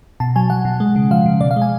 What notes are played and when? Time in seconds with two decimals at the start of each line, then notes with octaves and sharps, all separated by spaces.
0.20 B2 A5
0.36 F#3 G#5
0.50 F#3 F#5
0.65 B2
0.80 G#3
0.96 C#3
1.11 F3 F5
1.26 C#3
1.41 B2 D5
1.51 F5
1.56 G#3
1.62 G#5